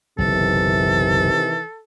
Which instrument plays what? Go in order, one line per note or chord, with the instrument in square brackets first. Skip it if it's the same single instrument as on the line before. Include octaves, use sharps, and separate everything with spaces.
[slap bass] F#1 B1 [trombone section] C3 D#3 E3 [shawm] A4